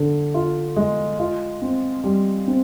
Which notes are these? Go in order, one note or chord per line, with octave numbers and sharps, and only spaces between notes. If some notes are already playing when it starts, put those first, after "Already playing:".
Already playing: D3
F4
G#3
F4
C4
G3
C4